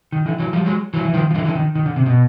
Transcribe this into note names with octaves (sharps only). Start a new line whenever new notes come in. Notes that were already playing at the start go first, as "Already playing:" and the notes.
D#3
D3 E3
E3 F#3
F3 G3
F#3 G#3
E3 F#3
E3
D#3 F3
F3
D3 E3
D3 E3
D#3
D#3
D3
C3
B2